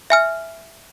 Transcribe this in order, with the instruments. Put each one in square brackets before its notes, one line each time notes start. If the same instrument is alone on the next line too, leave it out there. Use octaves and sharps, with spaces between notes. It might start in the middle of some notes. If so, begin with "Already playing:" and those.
[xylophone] E5 G#5 F6